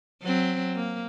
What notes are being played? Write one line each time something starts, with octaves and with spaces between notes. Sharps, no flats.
F#3 C4
A#3